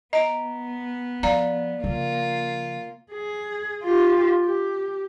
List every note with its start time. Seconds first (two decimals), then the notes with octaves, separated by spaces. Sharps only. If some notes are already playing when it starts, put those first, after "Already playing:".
0.13 B3 D#5 A#5 D7
1.23 F3 D5 F5 A#5
1.84 C#3 F3 A#3 F4
3.12 G#4
3.83 F4 G4
4.43 G4